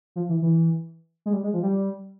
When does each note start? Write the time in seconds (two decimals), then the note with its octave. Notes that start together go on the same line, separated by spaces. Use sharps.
0.16 F3
0.29 E3
0.42 E3
1.26 G#3
1.33 G3
1.43 G#3
1.54 F3
1.63 G3